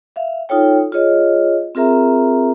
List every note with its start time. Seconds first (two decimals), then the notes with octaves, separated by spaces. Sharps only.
0.16 E5 F5
0.49 D#4 F4 A4 C#5 G5
0.92 F4 G#4 C#5 D#5
1.75 C4 F4 G#4 A#4 E5 A#5